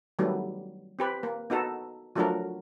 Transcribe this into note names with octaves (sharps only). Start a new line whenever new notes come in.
D#3 F#3 G3 A3 B3
C4 G4 B4
A#3
B3 D#4 F#4 A4
F3 F#3 A3 D4 F#4 A#4